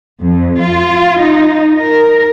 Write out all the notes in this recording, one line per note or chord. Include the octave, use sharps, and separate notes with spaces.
F2
F4
D#4
A#4